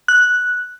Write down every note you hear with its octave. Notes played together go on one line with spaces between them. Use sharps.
F#6